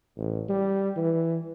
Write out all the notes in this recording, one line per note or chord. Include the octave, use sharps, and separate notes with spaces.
A1
G3
E3